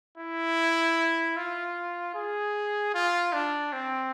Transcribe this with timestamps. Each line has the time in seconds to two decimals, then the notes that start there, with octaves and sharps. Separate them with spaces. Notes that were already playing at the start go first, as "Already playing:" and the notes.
0.18 E4
1.37 F4
2.14 G#4
2.94 F4
3.33 D4
3.73 C4